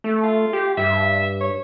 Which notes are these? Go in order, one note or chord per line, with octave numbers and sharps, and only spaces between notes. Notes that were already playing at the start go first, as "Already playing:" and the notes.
A3
F4
G4
G2 E5
C#5